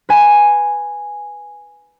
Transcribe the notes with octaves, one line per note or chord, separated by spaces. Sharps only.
B4 G#5